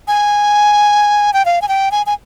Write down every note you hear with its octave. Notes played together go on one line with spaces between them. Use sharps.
G#5
G5
F5
G#5
G5
G#5
G#5